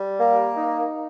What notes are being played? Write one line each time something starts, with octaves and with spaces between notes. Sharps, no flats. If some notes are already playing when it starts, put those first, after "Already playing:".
Already playing: G3
A#3
D#4